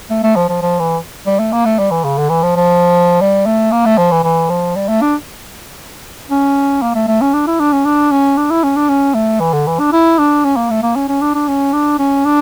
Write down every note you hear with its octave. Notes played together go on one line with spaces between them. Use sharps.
A3
A3
F3
F3
F3
E3
G3
A3
A#3
A3
G3
E3
C#3
D3
E3
F3
F3
G3
A3
A#3
A3
F3
E3
E3
F3
G3
A3
D4
C#4
A#3
A3
A3
C#4
D4
E4
D4
C#4
D4
C#4
D4
E4
C#4
D4
C#4
A3
E3
D3
E3
D4
E4
D4
C#4
A#3
A3
A#3
C#4
C#4
D4
D4
C#4
D4
C#4
D4